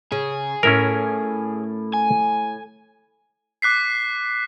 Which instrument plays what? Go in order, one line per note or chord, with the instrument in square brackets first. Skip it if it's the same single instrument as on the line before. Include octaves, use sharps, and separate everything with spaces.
[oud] C#3 [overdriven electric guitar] G#4
[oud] A2 [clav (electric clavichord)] C#4 E4 A#4
[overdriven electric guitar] G#5
[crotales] D6 F#6 B6 C7